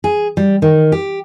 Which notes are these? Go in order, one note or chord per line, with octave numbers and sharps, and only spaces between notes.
G#4
G3
D#3
G4